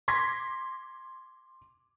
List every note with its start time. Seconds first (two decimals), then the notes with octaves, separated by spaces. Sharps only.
0.08 C6 D6 G#6 A#6 B6